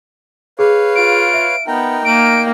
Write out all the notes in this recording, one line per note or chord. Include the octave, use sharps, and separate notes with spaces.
G#4 B4 C#5 F5
F4 D7
E5
B3 D#4 A#4 G5
A#3 D7